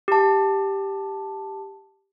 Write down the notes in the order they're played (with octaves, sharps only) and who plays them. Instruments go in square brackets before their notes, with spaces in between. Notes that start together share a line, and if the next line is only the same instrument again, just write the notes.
[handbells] G4 A5